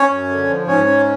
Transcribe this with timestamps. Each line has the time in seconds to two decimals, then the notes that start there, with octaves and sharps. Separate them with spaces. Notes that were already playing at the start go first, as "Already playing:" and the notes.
Already playing: C#4 C#5
0.10 F#2
0.29 D3
0.48 F3
0.67 G#2 C#4 C#5
0.86 C#4